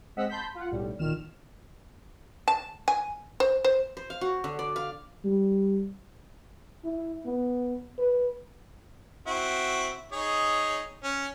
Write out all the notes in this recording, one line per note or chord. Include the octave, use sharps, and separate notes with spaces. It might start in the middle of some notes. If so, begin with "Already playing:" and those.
G#3 C4 D#5 F#5 E6 B6
A5 B5 C6 G6 B6
F4 F#5
B1 A2 G3
B1 A#2 D#3 F6 E7
A5
G#5
C5
C5
C5
F5
F#4
D3
D5
F5
G3
E4
B3
B4
C4 E4 F#4
D#4 G#4 C#5
C#4